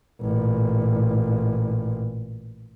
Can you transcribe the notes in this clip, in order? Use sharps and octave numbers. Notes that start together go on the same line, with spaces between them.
A1 A#2